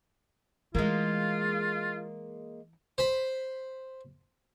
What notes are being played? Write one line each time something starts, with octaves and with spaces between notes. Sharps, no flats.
E3 G#3 A#3 F4
C5 B5